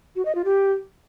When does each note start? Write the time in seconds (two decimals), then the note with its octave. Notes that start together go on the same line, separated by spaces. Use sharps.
0.16 F#4
0.25 D#5
0.35 F4
0.45 G4